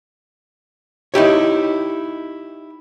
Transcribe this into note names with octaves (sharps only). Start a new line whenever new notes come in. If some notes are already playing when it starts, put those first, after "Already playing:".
D#4 E4 G4 C#5